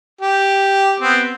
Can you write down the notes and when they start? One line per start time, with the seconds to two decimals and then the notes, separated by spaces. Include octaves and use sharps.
0.21 G4
1.00 B3 C4